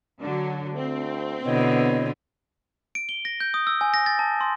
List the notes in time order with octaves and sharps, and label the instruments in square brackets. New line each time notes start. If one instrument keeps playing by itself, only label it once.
[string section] D3 F#3
[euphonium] D2 [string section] C4
[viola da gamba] B2 D3 [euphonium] B3 [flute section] E4 C#5 D#5
[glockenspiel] D7
G7
A#6
G6
D#6
E6
G#5
A#6
A6
A5
C6